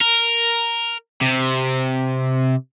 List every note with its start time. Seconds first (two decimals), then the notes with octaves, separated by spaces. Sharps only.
0.01 A#4
1.22 C3